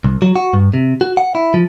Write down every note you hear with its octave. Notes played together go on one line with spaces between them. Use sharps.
C2
F#3
F#4
G2
C3
F#4
F#5
E4
F3